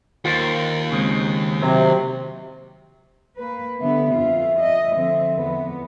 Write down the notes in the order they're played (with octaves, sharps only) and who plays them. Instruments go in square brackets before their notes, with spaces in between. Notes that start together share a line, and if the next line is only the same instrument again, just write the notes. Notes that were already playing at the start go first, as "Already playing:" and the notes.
[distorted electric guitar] D#2 [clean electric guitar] F4 A#4 C5
[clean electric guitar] C#3 G#3 C4
[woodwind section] C3 [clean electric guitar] F#3
[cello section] A#3 B4
[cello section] D3 G3 B3 [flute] E5
[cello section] F2 F4
D#5
D3 F3 C4
E2 B3